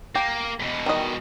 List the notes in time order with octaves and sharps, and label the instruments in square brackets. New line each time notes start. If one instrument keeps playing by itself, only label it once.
[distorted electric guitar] A#3 [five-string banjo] G4
[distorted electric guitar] E2 B2
[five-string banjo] D#3 G3 D#5